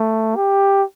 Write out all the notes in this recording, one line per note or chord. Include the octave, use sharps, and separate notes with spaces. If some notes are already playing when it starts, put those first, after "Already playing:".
Already playing: A3
G4